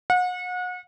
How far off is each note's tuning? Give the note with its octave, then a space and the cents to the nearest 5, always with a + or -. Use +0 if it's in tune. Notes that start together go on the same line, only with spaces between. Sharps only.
F#5 -35